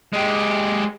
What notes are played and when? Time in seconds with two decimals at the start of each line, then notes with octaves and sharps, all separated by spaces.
0.13 G#3 G4